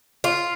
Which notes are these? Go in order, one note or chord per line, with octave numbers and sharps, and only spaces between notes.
F4